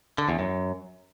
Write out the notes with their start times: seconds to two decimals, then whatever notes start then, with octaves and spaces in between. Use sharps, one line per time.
0.18 D3
0.29 E2
0.39 F#2